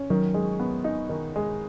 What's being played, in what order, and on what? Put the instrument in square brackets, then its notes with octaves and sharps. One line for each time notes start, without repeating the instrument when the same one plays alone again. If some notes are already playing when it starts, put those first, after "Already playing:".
Already playing: [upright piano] C#4
[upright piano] D#3 [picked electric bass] F#3
[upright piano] G#3
B3
D#4
D#3
G#3